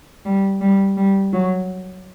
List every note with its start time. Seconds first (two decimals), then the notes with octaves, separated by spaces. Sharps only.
0.26 G3
0.61 G3
0.97 G3
1.33 F#3